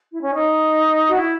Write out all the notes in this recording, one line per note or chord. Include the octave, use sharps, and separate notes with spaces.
E4
C#4
D#4
F#4
E4